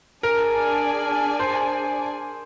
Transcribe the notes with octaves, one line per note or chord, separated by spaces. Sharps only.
D4 G#4 A#4 D5 G#5
C5